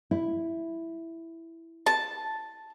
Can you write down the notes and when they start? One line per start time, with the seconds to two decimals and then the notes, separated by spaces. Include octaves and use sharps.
0.11 E4
1.86 A5